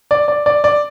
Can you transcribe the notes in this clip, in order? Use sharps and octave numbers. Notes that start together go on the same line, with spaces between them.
D5
D5
D5
D5